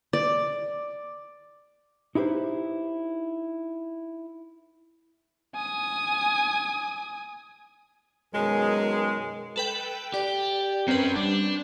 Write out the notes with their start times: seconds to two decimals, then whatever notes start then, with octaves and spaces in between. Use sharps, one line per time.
0.13 D5
2.15 D#4 E4 G4 B4 C5
5.54 G#5 D#6
8.34 F#2 B2 D#3 G#3
9.56 A4 B4 G5
10.14 G4 D5
10.88 C4 C#4 A#4 B4
11.16 G3 D4